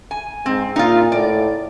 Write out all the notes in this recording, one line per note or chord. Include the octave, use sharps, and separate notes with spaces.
G#5
G#2 C4
A#2 D#4 F4
A2 D5